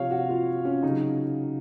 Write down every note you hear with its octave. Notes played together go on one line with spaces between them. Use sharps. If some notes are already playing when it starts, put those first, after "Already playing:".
Already playing: C3 F3 C#5 F5
F#4
F4
C#4
C#3 D#4
F#3